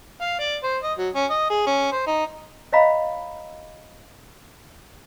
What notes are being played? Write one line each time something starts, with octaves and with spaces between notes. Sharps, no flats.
F5
D5
C5
D#5
F#3
C#4
D#5
G#4
C#4
C5
D#4
C#5 D#5 F5 A#5 B5